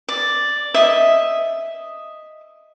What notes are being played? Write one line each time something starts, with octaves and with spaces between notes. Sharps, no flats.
D5
D#5 E5